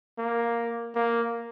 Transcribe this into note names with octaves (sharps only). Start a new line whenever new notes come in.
A#3
A#3